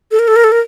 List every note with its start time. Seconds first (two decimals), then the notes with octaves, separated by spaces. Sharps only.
0.11 A4
0.19 A#4
0.28 A4
0.36 A#4
0.44 A4
0.52 A#4